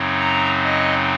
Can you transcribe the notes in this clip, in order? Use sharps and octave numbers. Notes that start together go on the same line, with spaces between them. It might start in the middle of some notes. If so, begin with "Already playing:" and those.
Already playing: F#2 C#3 F#3 C4 D#4
A#5
D#5